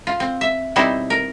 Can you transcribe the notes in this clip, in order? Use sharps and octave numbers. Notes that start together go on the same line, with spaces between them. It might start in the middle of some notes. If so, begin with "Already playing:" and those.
F4
C4
E5
B2 G3 C4 D#4 E4 C5
A#4